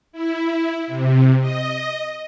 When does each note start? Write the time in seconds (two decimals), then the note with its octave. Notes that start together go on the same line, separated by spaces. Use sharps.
0.12 E4
0.87 C3
1.41 D#5